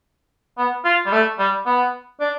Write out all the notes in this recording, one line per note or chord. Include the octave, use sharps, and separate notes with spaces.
B3
F4
G3
A3
G3
B3
D4